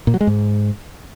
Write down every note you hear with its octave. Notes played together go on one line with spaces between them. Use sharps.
A#2
F#3
G#3
G#2